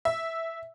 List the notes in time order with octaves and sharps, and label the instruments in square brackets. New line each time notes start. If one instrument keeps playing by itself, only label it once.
[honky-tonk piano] E5